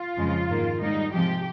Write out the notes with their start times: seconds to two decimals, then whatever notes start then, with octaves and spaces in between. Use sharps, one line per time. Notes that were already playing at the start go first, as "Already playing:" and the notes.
Already playing: F4
0.17 F2 C#3 F3 G#3
0.49 G#2 D#3 A#3
0.81 G#2 G3 A#3 D#4
1.13 C3 F3 G#3 G4